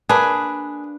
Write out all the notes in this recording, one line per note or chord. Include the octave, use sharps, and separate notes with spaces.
A#3 D4 G#4 B4